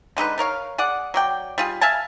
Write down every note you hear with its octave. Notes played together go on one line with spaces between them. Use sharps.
D3 G#3 D#4 B4
A3 A#4 C#5 F5
G#4 D5 F#5
F#3 D5 G5
G3 F4 G#4
E5 F5 G#5 A5